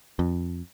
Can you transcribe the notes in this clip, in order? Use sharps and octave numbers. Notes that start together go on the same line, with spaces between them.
F2